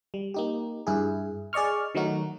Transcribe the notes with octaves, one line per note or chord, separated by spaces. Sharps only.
G3
A#3 D#4 G4
G2 E4 G#4
G#4 D5 D#5 C#6 F6
D#3 F#3 A3 D#4 F#4